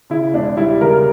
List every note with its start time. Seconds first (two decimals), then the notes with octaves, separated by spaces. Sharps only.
0.10 C#3 E4
0.34 E1 D4
0.57 G3 E4
0.81 C#3 A#4